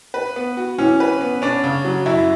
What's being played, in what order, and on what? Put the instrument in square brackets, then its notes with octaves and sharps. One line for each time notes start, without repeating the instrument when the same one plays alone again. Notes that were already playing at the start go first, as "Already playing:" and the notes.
[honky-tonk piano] B4
B3
F#4
[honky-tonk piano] E3 [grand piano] C#4
[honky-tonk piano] B4
B3
[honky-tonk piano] C#4 [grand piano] D4
[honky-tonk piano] C#3
F#3
[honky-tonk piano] F#2 [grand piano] E4